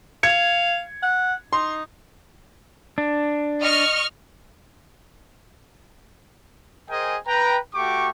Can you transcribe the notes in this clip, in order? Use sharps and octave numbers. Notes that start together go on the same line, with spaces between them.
F5 G#6 C#7
F#5
D#4 C6
D4
D#5 C#6 F6
G#4 A#4 C5 D#5 G5 G#5
B4 G5 A#5
A3 F#4 G4 G5 C#6 D6